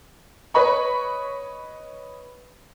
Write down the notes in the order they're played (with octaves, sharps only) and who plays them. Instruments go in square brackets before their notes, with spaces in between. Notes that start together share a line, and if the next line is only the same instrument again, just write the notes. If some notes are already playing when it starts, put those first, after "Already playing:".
[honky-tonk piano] B4 C#5 D#5 B5 C#6